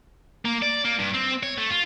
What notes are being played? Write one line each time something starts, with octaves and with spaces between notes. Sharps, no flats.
A#3
D5
A#3
G2
C4
C#5
A3
F4